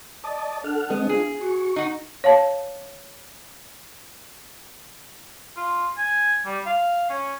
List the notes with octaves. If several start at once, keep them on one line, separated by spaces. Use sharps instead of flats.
D5 D#5 A5
D4 A4 F#5 F6
G#3 B3 C4 D#5
F4 G#4
F#4 C#6
D#4 F#4
C#5 F5 A5
F4
G#5
G3
F5
C#4